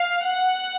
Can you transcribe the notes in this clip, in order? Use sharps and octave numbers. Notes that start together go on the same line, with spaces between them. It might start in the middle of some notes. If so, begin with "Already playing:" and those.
Already playing: F5
F#5